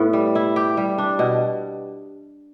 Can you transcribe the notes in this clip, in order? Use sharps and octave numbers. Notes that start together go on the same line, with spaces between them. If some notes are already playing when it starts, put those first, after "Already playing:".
Already playing: A2 B3
G3
E4
G4
G3
D4
B2